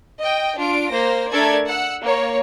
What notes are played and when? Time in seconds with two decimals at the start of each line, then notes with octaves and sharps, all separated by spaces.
0.20 D#5 G5
0.57 D4 F4 D7
0.91 A#3 C5 A#6
1.30 A3 D4 A4 A#4 D5 G#6
1.66 F#5 E6
2.02 A#3 C#5